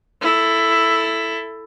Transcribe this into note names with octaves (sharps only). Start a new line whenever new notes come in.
E4 A4